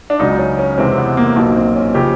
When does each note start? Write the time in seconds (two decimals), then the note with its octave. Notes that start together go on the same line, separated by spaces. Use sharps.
0.10 D4
0.19 C#2 C#3 F#3 D#4
0.39 C#4
0.59 C#4
0.78 E2 C3 E3 G#3 C4
0.98 B3
1.17 A#3
1.36 B1 A#2 F#3
1.56 C4
1.76 C#4
1.95 C#3 F3 G4